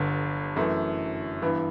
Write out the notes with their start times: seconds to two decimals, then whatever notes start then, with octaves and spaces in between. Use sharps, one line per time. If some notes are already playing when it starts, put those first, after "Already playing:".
Already playing: G1 G2 D3
0.56 F#2 E3 A3
1.42 G2 E3 B3